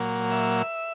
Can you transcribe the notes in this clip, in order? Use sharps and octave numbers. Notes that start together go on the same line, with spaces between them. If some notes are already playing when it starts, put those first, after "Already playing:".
Already playing: A#2 F#3 A#3
E5